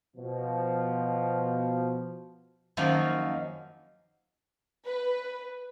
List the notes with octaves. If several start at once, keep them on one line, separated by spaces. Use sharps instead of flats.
B2 F3
F#2 D#3 F3 F#3 A#3 C#4
B4